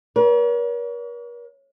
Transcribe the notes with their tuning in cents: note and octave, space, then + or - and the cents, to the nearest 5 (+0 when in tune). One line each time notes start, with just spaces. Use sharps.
A#4 +45 C#5 +45